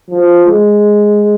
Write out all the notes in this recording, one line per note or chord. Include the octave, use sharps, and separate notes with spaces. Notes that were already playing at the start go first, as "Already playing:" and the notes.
F3
G#3